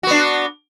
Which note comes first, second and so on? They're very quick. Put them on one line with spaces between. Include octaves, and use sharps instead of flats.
F#4 B3 D4